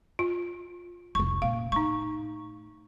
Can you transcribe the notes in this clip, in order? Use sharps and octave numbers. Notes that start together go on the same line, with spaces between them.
F4
F1 C2 C#6
A#2 C#3 F5
A2 D#4 C#6